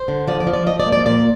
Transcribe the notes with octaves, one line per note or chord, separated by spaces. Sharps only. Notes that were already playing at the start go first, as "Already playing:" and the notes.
Already playing: C5
D3
F3 D5
D5
F3
D5
F3 D#5
D5
A#3
D5
A#2 D5